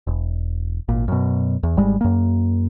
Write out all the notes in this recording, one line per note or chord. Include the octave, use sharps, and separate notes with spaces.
E1
G#1 A#2
F#2 B2
E2
G#1 G3 G#3
F#2 A#3